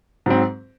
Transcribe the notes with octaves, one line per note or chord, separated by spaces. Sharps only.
G#2 F#3 C4